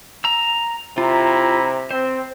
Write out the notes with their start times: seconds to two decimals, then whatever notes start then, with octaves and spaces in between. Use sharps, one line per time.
0.24 A#5 E6
0.98 C3 E4 F4 A#5 B5
1.91 C4 C5